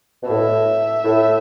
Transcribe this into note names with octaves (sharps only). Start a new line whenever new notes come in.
B2
A2 E5
A2